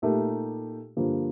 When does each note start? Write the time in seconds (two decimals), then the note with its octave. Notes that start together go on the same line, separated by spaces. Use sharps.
0.02 A#2 A3 D#4 G4 A#4
0.97 G2 D3 F3 A#3